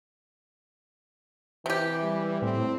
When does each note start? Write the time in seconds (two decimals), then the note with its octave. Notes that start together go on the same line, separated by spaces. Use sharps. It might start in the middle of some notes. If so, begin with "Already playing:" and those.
1.66 C3 E3 G4
2.02 G3
2.42 A2 C4